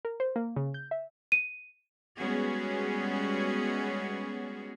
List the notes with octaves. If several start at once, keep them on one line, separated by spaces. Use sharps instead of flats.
A#4
C5
A#3
C#3
G6
E5
D#7
G3 G#3 B3 C#4 F#4 G#4